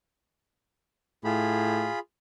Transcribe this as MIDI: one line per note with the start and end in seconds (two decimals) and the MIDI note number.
1.24 1.88 45
1.24 1.99 65
1.24 1.99 68
1.24 1.99 83